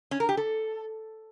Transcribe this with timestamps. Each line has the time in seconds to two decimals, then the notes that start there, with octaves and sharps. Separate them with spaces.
0.11 C#4
0.20 A#4
0.29 G4
0.37 A4